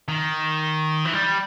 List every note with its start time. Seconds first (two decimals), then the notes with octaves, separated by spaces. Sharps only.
0.08 D#3
1.05 E3
1.13 G3